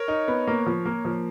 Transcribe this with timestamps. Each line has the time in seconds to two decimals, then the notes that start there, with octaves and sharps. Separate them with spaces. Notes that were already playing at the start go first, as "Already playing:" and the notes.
Already playing: A#4 C#5
0.08 D#4
0.28 B3
0.48 A#3
0.66 F3
0.86 A#3
1.05 F3